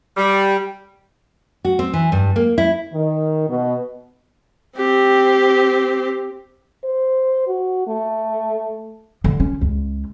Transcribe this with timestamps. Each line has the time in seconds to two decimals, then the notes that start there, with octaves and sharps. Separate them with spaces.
0.17 G3
1.65 F#4
1.79 C4
1.93 E3
2.12 G2
2.36 A#3
2.58 E4
2.93 D#3
3.49 B2
4.77 C4 G4
6.84 C5
7.47 F#4
7.87 A3
9.24 D3
9.40 C#4
9.61 C#2